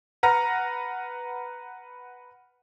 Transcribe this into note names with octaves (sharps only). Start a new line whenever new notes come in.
B4 F#5 A#5 F6 A#6